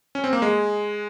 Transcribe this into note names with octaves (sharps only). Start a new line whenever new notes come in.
C#4
C4
A#3
G#3